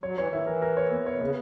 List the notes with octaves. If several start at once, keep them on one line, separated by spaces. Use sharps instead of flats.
F#3 C#5
E3 C#5
D#3
E4
E3
A#4
A#4
C#5
B3
C#5
B2
C#3 B3